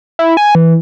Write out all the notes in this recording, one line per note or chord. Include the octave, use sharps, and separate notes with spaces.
E4
G#5
E3